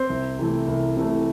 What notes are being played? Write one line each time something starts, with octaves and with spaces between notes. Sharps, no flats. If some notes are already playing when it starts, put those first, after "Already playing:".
Already playing: C4 C5
C2
C3 E3 A3
C2
C3 E3 A3